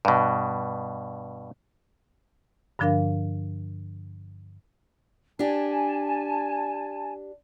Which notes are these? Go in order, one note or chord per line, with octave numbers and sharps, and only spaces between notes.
G2 B2
G2 D3 F3 D4 A#4 F5
D4 G4 G#5 A5